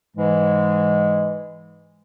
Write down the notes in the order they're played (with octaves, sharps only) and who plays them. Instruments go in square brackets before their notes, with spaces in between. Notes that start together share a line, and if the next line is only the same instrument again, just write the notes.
[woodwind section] G#2 E3 G#3